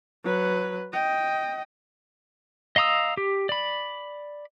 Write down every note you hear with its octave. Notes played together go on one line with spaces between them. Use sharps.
F#3 B4
D#5 G5
D#5 F5 A#5 D#6 E6
G4
D5 B5